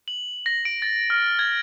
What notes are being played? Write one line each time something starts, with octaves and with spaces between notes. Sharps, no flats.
F#7
A#6
D7
A6
F6
G#6